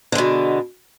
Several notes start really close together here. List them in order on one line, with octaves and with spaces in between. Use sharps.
D3 G#3 B2